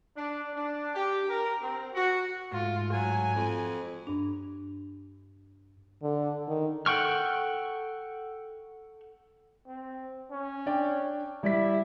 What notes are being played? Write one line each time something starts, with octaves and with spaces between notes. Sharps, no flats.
D4
D4
G4
A#4
C4
F#4
G#2 A3 F4
F#3 G#5
F2
G2 D4
D3
D#3
A4 F#5 G5 C#6 F6
C4
C#4
D4 D5 G5
G3 E4 D5 B6